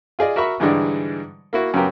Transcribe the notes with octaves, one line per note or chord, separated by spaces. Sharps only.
F4 G#4 D5 D#5
F#4 A#4 E5 B5 C#6
G#2 D3 E3 G3 G#3 D4
A#3 E4 F#4
F#2 C#3 B3 G4 A#4